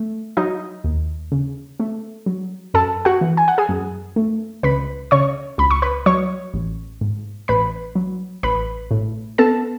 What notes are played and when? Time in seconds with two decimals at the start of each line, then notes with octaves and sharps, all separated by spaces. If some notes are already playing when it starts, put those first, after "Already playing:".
Already playing: A3
0.37 F#3 D#4 D#5
0.84 D#2
1.32 C#3
1.80 A3
2.26 F#3
2.74 F#2 A4 A5
3.05 F#4 F#5
3.21 E3
3.37 G#5
3.48 F#5
3.58 G#4 G#5
3.69 F#2
4.16 A3
4.63 C#2 B4 B5
5.11 C#3 C#5 C#6
5.58 C#2 B5
5.71 C#6
5.82 B4 B5
6.06 F#3 C#5 C#6
6.54 A1
7.01 G#2
7.48 A1 B4 B5
7.95 F#3
8.43 A1 B4 B5
8.91 A2
9.38 B3 A4 A5